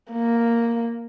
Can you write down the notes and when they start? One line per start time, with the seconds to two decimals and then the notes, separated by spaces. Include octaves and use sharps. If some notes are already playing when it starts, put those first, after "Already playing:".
0.12 A#3